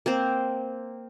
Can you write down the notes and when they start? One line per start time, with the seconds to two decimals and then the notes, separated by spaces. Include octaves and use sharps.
0.06 A#3 C4 C5